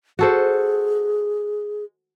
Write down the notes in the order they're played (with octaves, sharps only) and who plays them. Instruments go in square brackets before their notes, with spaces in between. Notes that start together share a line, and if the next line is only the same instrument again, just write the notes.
[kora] F#4 A4 C5 [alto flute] G#4